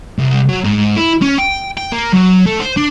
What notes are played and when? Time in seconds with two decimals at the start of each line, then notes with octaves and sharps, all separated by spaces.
0.18 C2
0.49 F#3
0.64 G#2
0.96 E4
1.22 C#4
1.38 G5
1.77 G5
1.92 A#3
2.13 F#3
2.46 A3
2.60 C5
2.77 D4